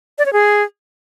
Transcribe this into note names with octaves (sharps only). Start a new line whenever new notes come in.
D5
C#5
G#4